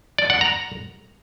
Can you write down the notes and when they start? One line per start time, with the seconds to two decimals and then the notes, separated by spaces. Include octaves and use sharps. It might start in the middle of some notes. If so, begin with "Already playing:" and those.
0.18 D5
0.30 F#5
0.41 A#5